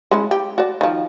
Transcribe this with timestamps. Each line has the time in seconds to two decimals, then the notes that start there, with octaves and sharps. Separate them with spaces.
0.11 G#3 C#4 E4
0.31 G4
0.58 F#4 D5
0.81 D#3 F3